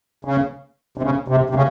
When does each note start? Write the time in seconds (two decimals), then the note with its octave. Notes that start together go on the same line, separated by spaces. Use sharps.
0.25 C#3
0.98 C3
1.03 C#3
1.28 C3
1.50 C3
1.55 C#3